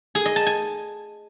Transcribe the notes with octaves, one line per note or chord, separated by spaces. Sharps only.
G#4
D#5
A5
G#5